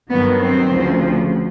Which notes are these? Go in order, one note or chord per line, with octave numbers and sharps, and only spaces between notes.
G2 D#3 F#3 B3
C4
D2 C#3 F3